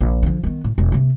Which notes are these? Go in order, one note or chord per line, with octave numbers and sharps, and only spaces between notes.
A#1
D3 F3
D#3 B3
A2
E1
C3 A#3